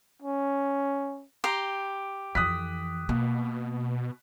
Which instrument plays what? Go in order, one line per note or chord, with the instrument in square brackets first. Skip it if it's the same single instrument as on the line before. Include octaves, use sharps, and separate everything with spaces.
[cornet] C#4
[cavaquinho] G4 A#5 C6
[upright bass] F2 E3 [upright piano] D#6 F#6 B6
[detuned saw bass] B2 [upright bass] A#3